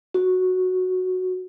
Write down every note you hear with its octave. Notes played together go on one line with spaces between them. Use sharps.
F#4